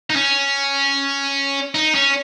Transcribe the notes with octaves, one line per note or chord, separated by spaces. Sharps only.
D#4
C#4
D#4
C#4